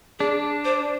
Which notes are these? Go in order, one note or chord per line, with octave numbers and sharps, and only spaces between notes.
D4 G#4
C5